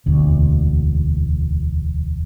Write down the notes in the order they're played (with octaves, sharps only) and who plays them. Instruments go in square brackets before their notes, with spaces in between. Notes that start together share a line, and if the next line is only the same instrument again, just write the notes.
[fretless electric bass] E1 D2